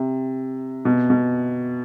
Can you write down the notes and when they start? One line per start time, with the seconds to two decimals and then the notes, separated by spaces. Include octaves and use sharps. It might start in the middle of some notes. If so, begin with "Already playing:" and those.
Already playing: C3
0.85 B2
1.10 B2